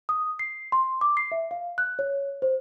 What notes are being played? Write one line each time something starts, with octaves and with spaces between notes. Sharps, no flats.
D#6
C7
C6
D6
C7
E5
F5
F#6
C#5
C5